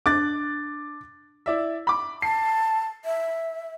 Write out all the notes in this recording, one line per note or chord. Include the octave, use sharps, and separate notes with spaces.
D4 D6 F#6 A6
E4 D5 E5
B5 D6
A5 C7
E5